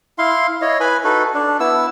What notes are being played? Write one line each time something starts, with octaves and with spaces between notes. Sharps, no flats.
E4 F5 C6
E4 C#5 D#5
B4 G#5 B5
D#4 F#4 A4 B4
D4
B3 E4 E6